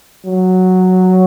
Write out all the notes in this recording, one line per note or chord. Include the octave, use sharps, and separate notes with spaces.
F#3